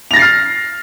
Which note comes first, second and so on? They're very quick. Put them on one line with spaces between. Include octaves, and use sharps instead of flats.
F7 A#6 A6 C7 F6